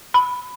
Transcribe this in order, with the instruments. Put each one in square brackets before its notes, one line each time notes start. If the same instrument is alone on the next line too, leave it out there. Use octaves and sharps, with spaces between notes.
[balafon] B5